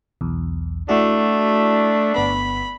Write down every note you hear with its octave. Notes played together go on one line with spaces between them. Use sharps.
B1 E2
A3 D4 E4 F#4
G1 B3 B5